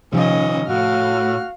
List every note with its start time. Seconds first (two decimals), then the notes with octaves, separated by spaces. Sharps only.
0.13 C3 D#3 F3 C#4 F4 D#5
0.68 A2 F#4 F5 F6